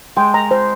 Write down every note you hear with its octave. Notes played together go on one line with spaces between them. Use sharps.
G#3 G5
A#5
C5